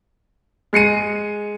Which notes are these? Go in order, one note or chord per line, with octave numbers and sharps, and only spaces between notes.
G#3 C7 C#7 D#7